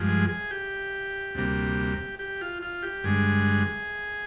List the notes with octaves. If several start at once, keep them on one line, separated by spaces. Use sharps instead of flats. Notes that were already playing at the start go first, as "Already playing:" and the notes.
Already playing: G2 F3 G#3
G#4
G#4
G4
D2 C3 G3 A#3
G4
F4
F4
G4
G2 D3 G#3 G#4